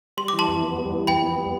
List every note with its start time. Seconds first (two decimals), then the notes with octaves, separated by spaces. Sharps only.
0.17 G3 C6
0.28 E3 D6
0.39 A5 C6
0.48 F2
0.63 B3
0.78 G3
0.93 E3
1.07 F2 G5 B5
1.22 B3
1.38 G3